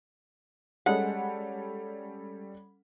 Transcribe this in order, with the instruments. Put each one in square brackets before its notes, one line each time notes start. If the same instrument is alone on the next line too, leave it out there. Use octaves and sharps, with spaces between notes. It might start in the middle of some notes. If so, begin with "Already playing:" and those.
[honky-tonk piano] G3 C#4 A4 [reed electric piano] G#3 [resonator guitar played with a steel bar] F#5